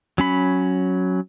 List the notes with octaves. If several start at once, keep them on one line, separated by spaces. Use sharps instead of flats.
F#3 C#4 B5